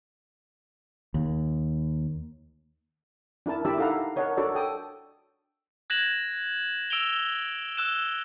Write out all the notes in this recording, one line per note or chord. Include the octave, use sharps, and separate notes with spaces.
D#2
D4 E4 A#4 A5
D4 E4 G4 D5 E5 E6
D#4 E4 A4 F5 F#5 A#5
A#4 C#5 D#5 F#5 A5
D4 F#4 A4 C#5 D5
A4 G5 D#6
F#6 G#6 A#6 E7 F#7
E6 D7 E7 F7 G7
E6 F#6 E7